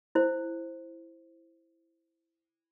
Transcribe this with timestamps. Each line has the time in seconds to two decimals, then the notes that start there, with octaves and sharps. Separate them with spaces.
0.15 E4 C5